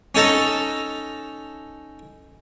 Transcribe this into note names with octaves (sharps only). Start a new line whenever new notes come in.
C#4 D#4 A4 A5 A#5